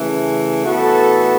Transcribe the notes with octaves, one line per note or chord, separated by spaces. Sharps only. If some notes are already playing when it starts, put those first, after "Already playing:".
Already playing: C#3 E3 A3
A2 E3 B3 F#4 A4